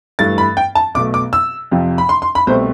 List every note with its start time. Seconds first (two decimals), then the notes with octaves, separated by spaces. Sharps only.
0.19 G2 E3 A3 A6
0.38 B5
0.57 G5
0.75 A5
0.94 B1 B2 A3 D6
1.14 D6
1.33 E6
1.72 F2 C3 F3
1.98 B5
2.09 C6
2.22 C6
2.35 B5
2.47 C2 B2 A3 C4 C5